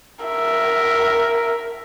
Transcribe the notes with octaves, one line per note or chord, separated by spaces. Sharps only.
A#4 E5